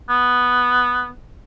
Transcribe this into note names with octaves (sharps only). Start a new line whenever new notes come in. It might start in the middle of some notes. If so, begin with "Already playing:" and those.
B3